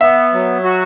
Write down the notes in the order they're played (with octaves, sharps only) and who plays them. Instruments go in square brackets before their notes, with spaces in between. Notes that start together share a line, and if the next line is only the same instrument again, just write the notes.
[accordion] B3 [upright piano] E5
[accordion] F#3
F#4